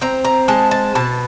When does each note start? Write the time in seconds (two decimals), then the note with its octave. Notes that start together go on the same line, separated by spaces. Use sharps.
0.01 C4 A#5
0.25 A#5
0.48 G#3 A5
0.71 A5
0.95 B2 A5